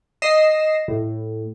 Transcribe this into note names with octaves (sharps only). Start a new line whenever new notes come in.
D#5 A#6 C7 E7
A2